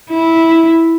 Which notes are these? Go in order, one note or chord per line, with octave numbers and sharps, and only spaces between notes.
E4